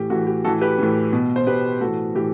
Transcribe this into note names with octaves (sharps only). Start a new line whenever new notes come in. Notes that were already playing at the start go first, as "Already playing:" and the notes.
Already playing: A2 E3 G4
A2 E3 F#4
G4
A2 E3 F#4 A4
G4 B4
A2 E3
B2
C5
B2 G4 B4
A2 E3 F#4 A4
A2 E3 G4